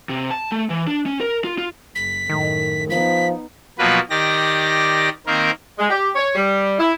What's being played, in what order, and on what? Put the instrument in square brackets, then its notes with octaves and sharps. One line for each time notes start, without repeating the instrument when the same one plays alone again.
[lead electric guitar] C3
A5
A3
E3
D4
C#4
A#4
F4
F4
[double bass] F#1 [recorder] B6
[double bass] F#2 A2 [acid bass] D#3
[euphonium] F3 [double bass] B3 D#4 [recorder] B6
[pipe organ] B2 F3 F#3 A#3 B4
D#3 G4 D5 A#6
D#3 A#3 C4 A#4
[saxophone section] G#3
G4
C#5
G3
E4